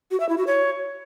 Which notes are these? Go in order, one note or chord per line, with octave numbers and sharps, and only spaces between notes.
F#4
E5
E4
F#4
C#5